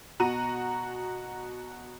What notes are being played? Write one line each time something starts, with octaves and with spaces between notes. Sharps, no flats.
B2 F#4 A#5 D#7